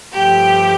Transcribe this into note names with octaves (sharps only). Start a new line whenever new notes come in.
G2 F3 A3 G4